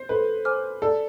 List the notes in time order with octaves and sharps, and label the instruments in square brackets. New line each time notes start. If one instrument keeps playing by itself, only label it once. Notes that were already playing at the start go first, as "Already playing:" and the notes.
Already playing: [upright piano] C5
[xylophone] A4 [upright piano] B4
[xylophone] C5 G#5 D6 F6
[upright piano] A4 [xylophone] D5